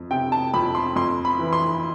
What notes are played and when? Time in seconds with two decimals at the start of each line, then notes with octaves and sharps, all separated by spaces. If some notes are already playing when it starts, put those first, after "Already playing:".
Already playing: F2
0.11 C3 G5
0.32 A5
0.54 F2 B5
0.75 C6
0.96 F2 C6
1.25 B5
1.39 E3
1.53 C6